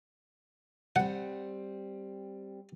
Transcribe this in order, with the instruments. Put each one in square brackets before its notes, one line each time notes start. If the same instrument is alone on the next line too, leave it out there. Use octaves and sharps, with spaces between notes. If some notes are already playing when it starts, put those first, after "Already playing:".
[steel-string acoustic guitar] G3 C4 [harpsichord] F#5